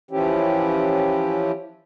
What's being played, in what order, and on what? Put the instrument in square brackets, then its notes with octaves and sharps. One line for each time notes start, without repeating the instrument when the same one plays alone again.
[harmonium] E3 F3 C#4 E4 G4